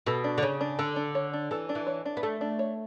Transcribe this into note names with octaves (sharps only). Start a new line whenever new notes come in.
B2 A4
D4
D3
C#3 C#5
D4
D3 A4
D4
C#5
D4
E3 A4
D4
E3
C#5
D4
B3
A3 A4
D4
C#5